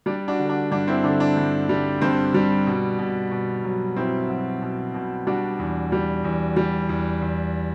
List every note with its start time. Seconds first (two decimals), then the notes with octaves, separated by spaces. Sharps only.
0.06 G3 D4
0.28 D4 F#4
0.39 D3
0.49 D4
0.71 G2 D4
0.87 C4 E4
1.04 D3 D4
1.20 D4
1.37 G2
1.69 G3
2.01 G2 C4
2.34 G3
2.67 B2
2.99 B2
3.31 B2
3.64 F#3
3.96 B2 C4 E4
4.29 F#3
4.61 B2
4.94 B2
5.27 G3 D4 F#4
5.59 E2
5.92 G3
6.24 E2
6.56 G3
6.89 E2
7.22 E2